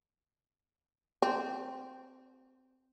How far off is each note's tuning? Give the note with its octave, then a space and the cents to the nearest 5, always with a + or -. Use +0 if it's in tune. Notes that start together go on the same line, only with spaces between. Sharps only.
C4 -10